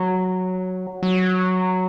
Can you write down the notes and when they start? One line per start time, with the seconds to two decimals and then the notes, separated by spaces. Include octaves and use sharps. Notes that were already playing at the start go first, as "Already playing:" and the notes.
Already playing: F#3
1.03 F#3